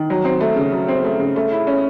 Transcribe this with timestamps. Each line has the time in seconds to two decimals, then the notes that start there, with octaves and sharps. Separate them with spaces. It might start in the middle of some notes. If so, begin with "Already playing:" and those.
Already playing: D#3
0.10 F#3
0.25 C4
0.41 A3
0.56 C#3
0.72 F#3
0.88 C4
1.04 A3
1.19 C#3
1.36 A3
1.51 E4
1.67 C#4